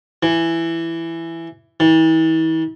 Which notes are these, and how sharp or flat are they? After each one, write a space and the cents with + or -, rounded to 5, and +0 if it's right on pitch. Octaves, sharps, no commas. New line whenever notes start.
E3 +10
E3 -40